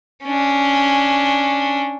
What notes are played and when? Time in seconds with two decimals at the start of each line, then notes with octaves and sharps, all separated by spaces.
0.24 C#4 D4